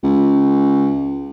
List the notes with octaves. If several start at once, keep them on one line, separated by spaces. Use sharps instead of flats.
C#2